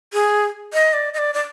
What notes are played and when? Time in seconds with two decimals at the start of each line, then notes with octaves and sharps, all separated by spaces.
0.13 G#4
0.74 D#5
0.93 D5
1.14 D#5
1.18 D5
1.34 D5